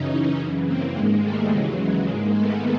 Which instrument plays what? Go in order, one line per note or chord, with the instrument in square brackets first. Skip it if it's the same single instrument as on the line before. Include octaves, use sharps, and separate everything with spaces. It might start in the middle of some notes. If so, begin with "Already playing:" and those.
Already playing: [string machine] F#2 C#3 E3 C#4 D#4
F#2 C#3 E3
A#3 C4
G#2 D#3 G#3 A#3
G3 A3
D#2 C#3 E3 F#3 G#3
F#3 G#3
G#2 D#3 G#3 A#3
A3 B3